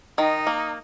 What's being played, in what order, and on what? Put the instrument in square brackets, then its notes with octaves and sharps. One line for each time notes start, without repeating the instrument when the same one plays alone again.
[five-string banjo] D#3 [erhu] D#4
[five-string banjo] A#3